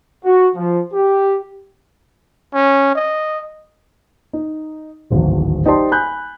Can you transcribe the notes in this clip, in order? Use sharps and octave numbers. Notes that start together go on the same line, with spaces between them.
F#4
F3
G4
C#4
D#5
D#4
D1 G#1 E2
D#4 G4 C5 D5 A5 C6
G#5 B5 F#6 G6